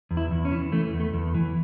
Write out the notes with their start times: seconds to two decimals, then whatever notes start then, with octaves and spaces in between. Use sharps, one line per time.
0.11 E2
0.17 E4
0.31 E2
0.45 C#4
0.52 E3
0.72 E3 A3
0.93 E2
1.00 A3
1.14 E2
1.35 E3